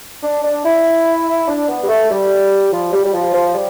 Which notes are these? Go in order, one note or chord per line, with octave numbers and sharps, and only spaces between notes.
D4
D4
E4
D4
B3
G3
A3
G3
F3
G3
G3
F3
F3
G3